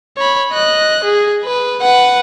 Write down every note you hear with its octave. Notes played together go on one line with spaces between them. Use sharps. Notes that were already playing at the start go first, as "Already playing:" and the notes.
C#5 B5
D#5 F#6
G#4
B4
B4 F#5